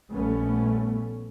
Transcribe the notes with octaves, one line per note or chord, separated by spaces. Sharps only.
A#1 G3 A3 B3 C#4